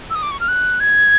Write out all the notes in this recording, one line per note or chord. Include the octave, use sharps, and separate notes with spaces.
E6
D#6
D6
C#6
F6
F#6
G#6